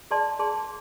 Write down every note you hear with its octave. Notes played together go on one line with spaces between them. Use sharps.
G#4 D5 A5 C6
G#4 D5 A5 C6